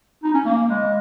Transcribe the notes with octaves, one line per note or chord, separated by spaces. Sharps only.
D#4
C#4
A#3
G#3